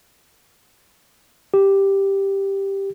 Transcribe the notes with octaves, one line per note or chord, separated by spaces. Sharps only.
G4